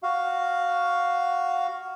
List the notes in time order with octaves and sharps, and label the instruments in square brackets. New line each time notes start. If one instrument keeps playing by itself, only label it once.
[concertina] F#4 F5